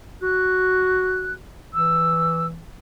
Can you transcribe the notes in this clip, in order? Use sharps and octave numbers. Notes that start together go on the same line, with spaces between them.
F#4 F#6
E3 E6